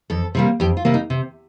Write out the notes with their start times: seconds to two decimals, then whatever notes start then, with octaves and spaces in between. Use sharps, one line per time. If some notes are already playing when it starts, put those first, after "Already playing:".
0.10 F2 A4
0.35 C3 G3 A#3
0.60 F2 G4
0.77 F4
0.85 C3 G3 A#3
0.94 D#4
1.10 C3